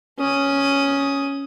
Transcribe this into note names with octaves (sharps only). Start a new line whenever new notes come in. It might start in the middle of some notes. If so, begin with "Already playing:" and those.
C#4 D#6